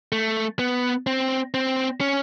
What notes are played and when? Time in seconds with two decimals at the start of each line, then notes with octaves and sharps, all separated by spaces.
0.12 A3
0.59 B3
1.07 C4
1.54 C4
2.01 C#4